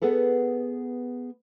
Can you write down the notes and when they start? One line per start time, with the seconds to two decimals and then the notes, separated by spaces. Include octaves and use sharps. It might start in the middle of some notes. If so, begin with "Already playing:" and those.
0.02 B3 G#4 A4 B4